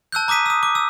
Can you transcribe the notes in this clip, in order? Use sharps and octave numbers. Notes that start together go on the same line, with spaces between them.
A5 E6 F#6 G6
A#5 D6 D#6 B6 D#7
D#6 E6
D6
E6